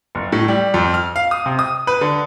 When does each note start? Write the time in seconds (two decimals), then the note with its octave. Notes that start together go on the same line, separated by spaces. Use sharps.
0.15 F#1
0.32 A2
0.48 G3
0.74 F2
0.94 F6
1.16 F5
1.31 D#6
1.46 C3
1.59 D#6
1.87 B4
2.01 D3